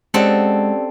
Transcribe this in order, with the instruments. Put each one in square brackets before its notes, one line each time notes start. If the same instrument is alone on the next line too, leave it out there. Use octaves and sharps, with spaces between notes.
[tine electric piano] G#3 [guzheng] C4 A4 F#5 [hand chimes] C#4 G4 D5